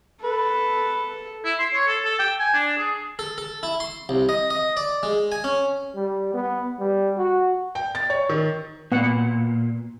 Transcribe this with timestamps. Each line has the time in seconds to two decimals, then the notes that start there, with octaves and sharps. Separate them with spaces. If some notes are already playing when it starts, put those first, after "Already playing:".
0.24 A4 B4
1.45 E4
1.59 C6
1.74 C#5
1.87 A4
2.05 A4
2.20 G5
2.39 G#5
2.54 D4
2.78 G#4
3.19 A4
3.38 A4
3.63 E4
3.80 C6
4.09 C2
4.29 D#5
4.50 D#5
4.77 D5
5.03 G#3
5.32 G#5
5.44 C#4
5.95 G3
6.34 B3
6.80 G3
7.18 F#4
7.75 G5
7.95 A6
8.10 C#5
8.29 D#3
8.92 A#2 B3 F#5